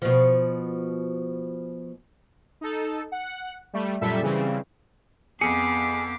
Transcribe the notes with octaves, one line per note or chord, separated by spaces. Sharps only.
B2 F3
D#4 A4
F#5
G3 A3
F#2 A#2 G3 A4 E5
C#3 E3 G3 C4
F2 B3 G#4 D6 C7 C#7